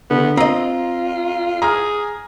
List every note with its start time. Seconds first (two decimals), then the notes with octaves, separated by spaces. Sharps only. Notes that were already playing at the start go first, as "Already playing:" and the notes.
0.11 D3 B3
0.37 C4 F4 D#5 A#5
1.62 G#4 A#5 F6